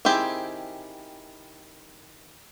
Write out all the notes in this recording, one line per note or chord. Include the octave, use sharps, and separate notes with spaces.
D#3 C4 E4 G4 G#4